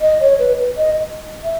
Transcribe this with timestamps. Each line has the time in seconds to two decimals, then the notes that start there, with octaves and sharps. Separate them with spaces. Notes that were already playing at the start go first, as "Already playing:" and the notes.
0.01 D#5
0.20 C#5
0.39 B4
0.77 D#5
1.44 E5